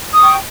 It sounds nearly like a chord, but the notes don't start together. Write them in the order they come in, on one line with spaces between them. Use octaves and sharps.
D#6 C#6 G5